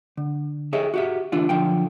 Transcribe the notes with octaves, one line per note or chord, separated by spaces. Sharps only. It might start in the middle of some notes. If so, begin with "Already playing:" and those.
D3
G4 G#4 C#5 D#5 E5
F#4 G4 E5
D3 E3 D4 F4
B1 D3 F3 G5